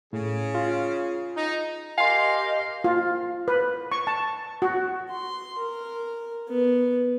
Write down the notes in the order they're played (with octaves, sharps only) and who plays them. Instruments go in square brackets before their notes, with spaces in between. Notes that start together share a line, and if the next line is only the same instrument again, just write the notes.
[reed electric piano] A2 [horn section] C#3 G#4
[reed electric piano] F4
[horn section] D#4
[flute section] G4 A#4 D#5 [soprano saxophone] F5 [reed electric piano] G#5 C6
[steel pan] F4
B4
C#6
A5
F#4
[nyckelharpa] C6
A#4
B3